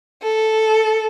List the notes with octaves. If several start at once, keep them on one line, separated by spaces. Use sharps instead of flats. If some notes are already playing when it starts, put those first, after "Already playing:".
A4